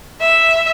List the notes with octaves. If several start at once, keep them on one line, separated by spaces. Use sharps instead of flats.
E5